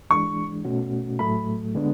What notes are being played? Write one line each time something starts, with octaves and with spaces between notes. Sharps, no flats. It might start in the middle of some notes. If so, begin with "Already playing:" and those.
E3 G#3 D4 C#6
B2 A3 C#4 F#4
A2 F#3 A3 B5
D3 G#3 B3 D4